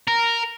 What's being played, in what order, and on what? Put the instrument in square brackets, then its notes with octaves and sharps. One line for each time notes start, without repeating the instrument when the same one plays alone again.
[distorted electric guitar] A#4